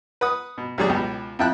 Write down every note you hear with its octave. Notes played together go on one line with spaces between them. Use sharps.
B4 F#5 D#6
B2
D2 F#3 G3 G#4 D5
C#2 B2 G4
F2 E4 G5 A5 F#6